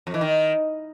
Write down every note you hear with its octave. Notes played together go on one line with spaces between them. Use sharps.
F2
E3
D#3